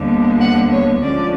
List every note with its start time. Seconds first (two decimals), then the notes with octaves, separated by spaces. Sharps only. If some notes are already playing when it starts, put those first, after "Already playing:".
Already playing: D#2 D3 G3 B3
0.40 F#5
0.72 C#5
1.02 D2 D3 F3 G#3 C#4 D5